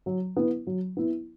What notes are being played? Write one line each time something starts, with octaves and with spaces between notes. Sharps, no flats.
F#3
B3 E4
F#3
B3 E4